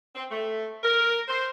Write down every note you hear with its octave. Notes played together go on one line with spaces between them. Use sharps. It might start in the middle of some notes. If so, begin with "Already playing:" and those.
C4
A3
A#4
C5